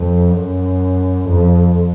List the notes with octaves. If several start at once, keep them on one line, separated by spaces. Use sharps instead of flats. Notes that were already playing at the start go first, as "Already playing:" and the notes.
Already playing: F2
F#2
F2